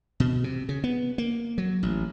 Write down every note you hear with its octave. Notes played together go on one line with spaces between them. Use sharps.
B2
C3
C#3
B3
A#3
F#3
A1